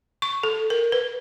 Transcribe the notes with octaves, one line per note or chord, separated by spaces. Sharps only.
C#6
A4
A#4
B4